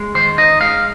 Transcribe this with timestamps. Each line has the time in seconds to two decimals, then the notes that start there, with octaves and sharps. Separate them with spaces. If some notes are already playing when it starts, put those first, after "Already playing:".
Already playing: G#3
0.14 D#3 C5
0.38 D#4 D#5
0.60 G#3 F5